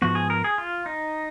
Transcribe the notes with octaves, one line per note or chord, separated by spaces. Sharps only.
G#2 F3 B3 F#4
G#4
A#4
G#4
F4
D#4